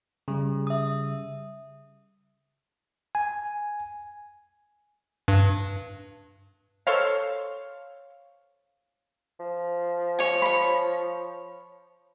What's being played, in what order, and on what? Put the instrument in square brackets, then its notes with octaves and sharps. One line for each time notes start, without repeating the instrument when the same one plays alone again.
[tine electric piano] C#3 G3
[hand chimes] E5 D#6
[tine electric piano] G#5
[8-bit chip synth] G2
[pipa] A4 C5 C#5 F5
[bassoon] F3
[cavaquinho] C#5 G#5
C#5 B5